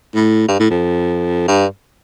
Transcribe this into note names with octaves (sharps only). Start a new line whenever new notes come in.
A2
G2
A2
F2
G2